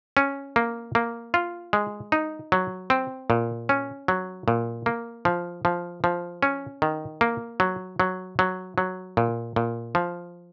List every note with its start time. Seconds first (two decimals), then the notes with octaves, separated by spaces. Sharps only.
0.17 C#4
0.56 A#3
0.95 A#3
1.34 F4
1.73 G#3
2.12 D#4
2.52 F#3
2.90 C4
3.30 A#2
3.69 C#4
4.08 F#3
4.48 A#2
4.86 A#3
5.25 F3
5.65 F3
6.04 F3
6.43 C#4
6.82 D#3
7.21 A#3
7.60 F#3
8.00 F#3
8.39 F#3
8.78 F#3
9.17 A#2
9.56 A#2
9.95 F3